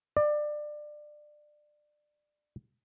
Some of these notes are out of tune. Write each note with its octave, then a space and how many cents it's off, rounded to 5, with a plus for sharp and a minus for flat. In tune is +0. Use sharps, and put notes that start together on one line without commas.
D5 +25